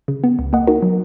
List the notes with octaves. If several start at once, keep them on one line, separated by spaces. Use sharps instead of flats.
C#3
B3
C#2
A#3 D#5 F#5
D#4 F#4 A#4
F#3